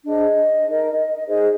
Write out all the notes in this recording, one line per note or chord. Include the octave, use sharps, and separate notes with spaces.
D4 G#4 C5 D#5
D#4 A#4
D#4 G#4 C5 D#5